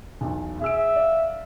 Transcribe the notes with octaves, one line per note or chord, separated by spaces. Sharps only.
B1 E2
G#4 E5 E6 D7
D5 F5